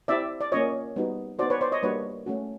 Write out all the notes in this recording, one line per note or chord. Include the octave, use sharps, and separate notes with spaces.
C4 E4 G4 D5 E5
D5
A#3 C#4 F4 C#5 D#5
G3 B3 D#4 F#4
B3 D#4 F#4 C5 D5
B4 C#5
C5 D5
C#5 D#5
G3 A#3 D4 F#4 B4 C#5
A3 C#4 F#4